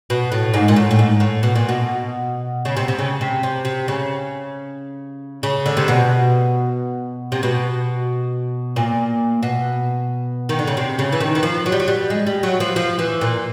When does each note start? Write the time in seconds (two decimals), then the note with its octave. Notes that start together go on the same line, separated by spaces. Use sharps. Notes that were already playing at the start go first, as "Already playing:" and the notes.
0.10 B2
0.32 A2
0.54 G#2
0.68 A#2
0.76 A2
0.91 A2
0.99 G#2
1.20 A2
1.43 B2
1.55 A#2
1.69 B2
2.65 C#3
2.77 C3
2.88 C3
2.99 C#3
3.21 C3
3.43 C3
3.65 C3
3.88 C#3
5.43 C#3
5.66 D3
5.77 C3
5.88 B2
7.32 C3
7.43 B2
8.76 A#2
9.43 B2
10.49 D#3
10.59 D3
10.67 C#3
10.77 C3
10.99 C#3
11.12 E3
11.20 D#3
11.35 E3
11.43 F3
11.66 F#3
11.72 G3
11.80 F#3
11.88 G3
12.10 G#3
12.27 G3
12.43 F#3
12.60 F3
12.76 F3
12.99 E3
13.21 A#2